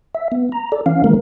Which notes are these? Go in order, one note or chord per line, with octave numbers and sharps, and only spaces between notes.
E5
B3
A#5
A4 D5
E3 C#4 F5
D#3 E3 G#3 A#3 A#4